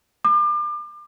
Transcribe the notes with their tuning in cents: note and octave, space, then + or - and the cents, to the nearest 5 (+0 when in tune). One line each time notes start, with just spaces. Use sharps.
D6 +35